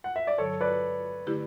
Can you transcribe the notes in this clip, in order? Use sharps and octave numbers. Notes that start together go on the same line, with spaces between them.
F#5
E5
D5
G2 D3 F#3 A4 C#5
B4 D5
D3 A3 E4 G4